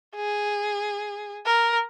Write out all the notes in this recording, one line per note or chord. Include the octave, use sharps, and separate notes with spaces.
G#4
A#4